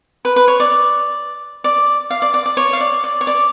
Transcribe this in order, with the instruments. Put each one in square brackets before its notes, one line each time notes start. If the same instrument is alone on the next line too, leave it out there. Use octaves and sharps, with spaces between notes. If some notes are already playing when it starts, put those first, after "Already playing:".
[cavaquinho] B4
B4
C#5
D5
D5
F5
D5
D5
D5
C#5
F5
D5
D5
C#5
D5